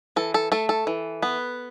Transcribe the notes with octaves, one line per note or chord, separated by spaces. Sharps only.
E3 A4
A4
A3 A4
A4
E3
B3